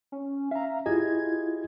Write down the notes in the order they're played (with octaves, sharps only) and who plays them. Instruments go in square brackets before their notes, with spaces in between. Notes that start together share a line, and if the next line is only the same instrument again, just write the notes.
[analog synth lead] C#4
[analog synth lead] E5 [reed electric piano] F5 A#5
[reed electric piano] E4 F4 [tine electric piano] G4 G#4 D#5 [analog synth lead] G#6